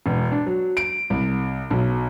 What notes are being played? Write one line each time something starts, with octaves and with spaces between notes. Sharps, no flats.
E1
D4
F#3
D7
C2
B1